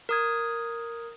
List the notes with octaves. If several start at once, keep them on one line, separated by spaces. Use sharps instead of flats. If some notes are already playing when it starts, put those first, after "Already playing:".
A#4 D#6 G#6